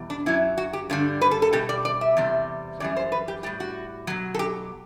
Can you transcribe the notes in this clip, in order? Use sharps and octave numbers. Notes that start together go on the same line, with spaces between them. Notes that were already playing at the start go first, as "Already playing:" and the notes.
Already playing: E2 B2 G3
D4
F#2 F#3 E4
F#4
G4
G2 D3 G3
B4
A4
A4
B2 G3 G4
D5
D5
E5
E2 C3 G3
F#2 E3 G3 D5
C5
B4
G4
A2 G3 G4
F#4
B2 F#3
A4
G4